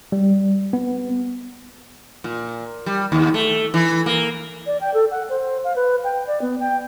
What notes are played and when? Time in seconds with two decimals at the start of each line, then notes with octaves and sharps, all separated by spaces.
0.12 G3
0.73 B3
2.24 A#2
2.86 G3
3.12 D#2
3.34 A3
3.74 E3
4.06 A#3
4.66 D5
4.81 G5
4.94 A4
5.11 F#5
5.29 C5
5.64 F5
5.75 B4
6.04 G5
6.27 D5
6.41 B3
6.60 G5